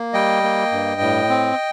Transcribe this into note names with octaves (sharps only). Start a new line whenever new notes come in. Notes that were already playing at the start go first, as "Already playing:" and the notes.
Already playing: A#3
G3 D#5 G5
A#3
G2
A2
C4